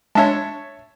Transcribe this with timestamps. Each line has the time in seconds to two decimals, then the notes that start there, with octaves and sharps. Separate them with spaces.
0.15 G#3 D4 C#5 E5 A5